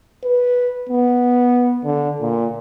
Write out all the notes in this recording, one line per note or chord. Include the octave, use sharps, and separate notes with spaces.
B4
B3
D3
A#2